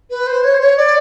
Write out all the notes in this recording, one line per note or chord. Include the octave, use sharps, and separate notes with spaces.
B4
C5
C#5
C5
C#5
D5